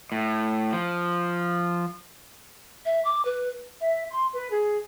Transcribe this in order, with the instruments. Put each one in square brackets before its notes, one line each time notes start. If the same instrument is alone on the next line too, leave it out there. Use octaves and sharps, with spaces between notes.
[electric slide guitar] A2
F3
[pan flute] E5
D6
B4
[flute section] E5
C6
B4
G#4